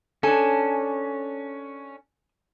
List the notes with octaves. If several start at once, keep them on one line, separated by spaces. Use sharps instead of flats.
C#4 D4 A4 G#5